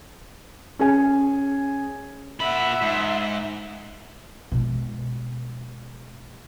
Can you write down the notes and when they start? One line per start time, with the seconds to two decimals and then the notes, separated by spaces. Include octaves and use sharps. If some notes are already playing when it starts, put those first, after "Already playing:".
0.79 C#4 G#4 G#5
2.40 A#2 E5 F#5 B5
2.82 G#2
4.52 B2 G#3